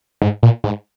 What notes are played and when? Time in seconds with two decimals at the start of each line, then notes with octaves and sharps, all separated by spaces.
0.22 G#2
0.43 A#2
0.64 G#2